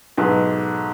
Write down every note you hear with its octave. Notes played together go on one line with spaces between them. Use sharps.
B1 G#2 B4